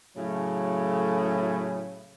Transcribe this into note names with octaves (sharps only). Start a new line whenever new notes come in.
A2 C#3 F#3 A3